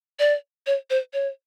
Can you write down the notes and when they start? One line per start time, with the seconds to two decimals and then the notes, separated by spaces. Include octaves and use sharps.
0.19 D5
0.67 C#5
0.90 C5
1.13 C#5